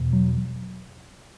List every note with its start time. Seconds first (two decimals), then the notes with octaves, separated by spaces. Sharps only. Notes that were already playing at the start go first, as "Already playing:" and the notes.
Already playing: E2 B2
0.13 F#3